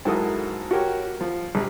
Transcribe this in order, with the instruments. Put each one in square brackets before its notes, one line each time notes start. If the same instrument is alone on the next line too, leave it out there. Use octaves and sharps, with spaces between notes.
[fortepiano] G#2 F#3 E4 A4 A#4 D#6
F#4 G4 A#4 C#5
F3
A#1 G3